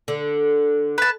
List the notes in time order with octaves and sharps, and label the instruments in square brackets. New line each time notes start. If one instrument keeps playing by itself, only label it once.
[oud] D3
[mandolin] B4 A5